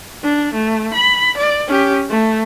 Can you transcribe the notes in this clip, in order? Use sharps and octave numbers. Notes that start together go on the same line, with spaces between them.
D4
A3
B5
D5
C#4 G4
A3